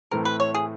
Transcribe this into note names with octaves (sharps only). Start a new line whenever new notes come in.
A2 E3 A3 C4 A#4
B4
C#5
G#4